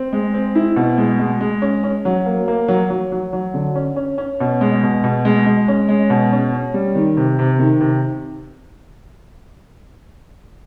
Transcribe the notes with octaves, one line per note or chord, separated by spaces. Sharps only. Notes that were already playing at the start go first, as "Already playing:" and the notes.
Already playing: C4
G#3
C4
E4
B2
G#3
G#3
G#3
C#4
C#4
F#3
A#3
A#3
F#3
F#3
F#3
F#3
D3
C#4
C#4
C#4
B2
G#3
B2
B2
G#3
G#3
C#4
G#3
B2
C#4
C#4
G3
D#3
C3
C3
D#3
C3